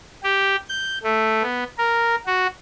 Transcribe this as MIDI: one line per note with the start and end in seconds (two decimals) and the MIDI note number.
0.23 0.56 67
0.69 0.98 91
1.03 1.42 57
1.43 1.64 59
1.78 2.15 70
2.26 2.47 66